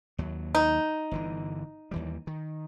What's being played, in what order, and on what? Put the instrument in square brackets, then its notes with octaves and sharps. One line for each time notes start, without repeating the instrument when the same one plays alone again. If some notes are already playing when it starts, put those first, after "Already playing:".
[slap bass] D#2 F#3
[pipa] D#4
[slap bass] G1 D3 E3
D#2 E3 G3
D#3